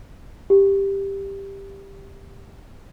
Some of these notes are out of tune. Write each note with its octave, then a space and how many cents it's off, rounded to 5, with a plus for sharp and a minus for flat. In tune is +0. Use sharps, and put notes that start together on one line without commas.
G4 +5